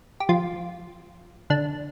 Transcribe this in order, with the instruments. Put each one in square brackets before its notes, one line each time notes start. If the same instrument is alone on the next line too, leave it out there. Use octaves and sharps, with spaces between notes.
[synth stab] G4
F3 F4
D3 D4